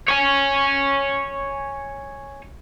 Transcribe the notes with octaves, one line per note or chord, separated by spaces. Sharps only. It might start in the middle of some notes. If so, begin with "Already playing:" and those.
C#5 G#5